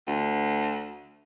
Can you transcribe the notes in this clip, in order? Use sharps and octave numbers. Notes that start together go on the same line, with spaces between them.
D2